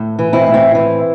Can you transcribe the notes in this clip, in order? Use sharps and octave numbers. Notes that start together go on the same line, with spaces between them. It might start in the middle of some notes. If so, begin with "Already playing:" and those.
Already playing: A2
E3
C4 E4
A2
C4 E4
E3